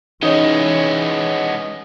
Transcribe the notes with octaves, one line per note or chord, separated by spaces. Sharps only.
E3 G#3 B3 C#4 D#4 C#5 D#5